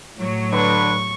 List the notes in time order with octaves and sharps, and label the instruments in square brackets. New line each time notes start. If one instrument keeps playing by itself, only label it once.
[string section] A2 F#3
[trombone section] D3 B4 [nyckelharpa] C#6